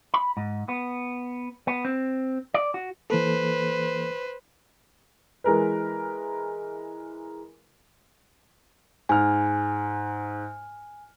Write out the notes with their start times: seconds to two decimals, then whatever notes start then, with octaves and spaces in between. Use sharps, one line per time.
0.14 B5
0.37 G#2
0.69 B3
1.67 B3
1.85 C4
2.54 D5
2.74 F#4
3.10 E3 A#3 A4 B4 C5
5.44 E3 G#3 A#4 B4
9.09 G#2 G#5 F6